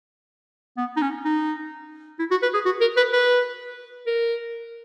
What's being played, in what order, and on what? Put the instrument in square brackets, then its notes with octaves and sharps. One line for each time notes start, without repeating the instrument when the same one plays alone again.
[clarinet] B3
D#4
C#4
D#4
E4
F#4
B4
G#4
F#4
A#4
B4
B4
A#4